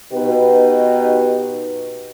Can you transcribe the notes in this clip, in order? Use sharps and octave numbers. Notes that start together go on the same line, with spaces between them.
B2 D#4 F#4 G4 B4